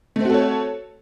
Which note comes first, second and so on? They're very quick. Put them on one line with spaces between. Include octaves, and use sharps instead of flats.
A3 C4 F#4 A4 C#5